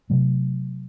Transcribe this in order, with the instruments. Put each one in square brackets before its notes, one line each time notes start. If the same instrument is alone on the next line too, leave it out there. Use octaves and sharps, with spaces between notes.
[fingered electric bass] C3 F#3 A3